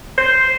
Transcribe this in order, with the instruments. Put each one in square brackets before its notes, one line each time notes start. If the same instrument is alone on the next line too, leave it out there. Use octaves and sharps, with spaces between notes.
[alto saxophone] C5